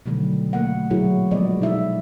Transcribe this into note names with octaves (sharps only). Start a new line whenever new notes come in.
B2 D3 D#3 F#3 G3 A3
A3 A#3 F#5
A#2 F#3 E4 F#4 G#4 A#4
F3 G3 G#3 B3 D5 D#5
B2 D#4 E4 E5